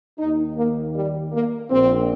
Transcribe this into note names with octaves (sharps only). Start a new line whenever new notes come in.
D#2 D#3 D#4
A#3
G3
A#3
A#1 A#2 C4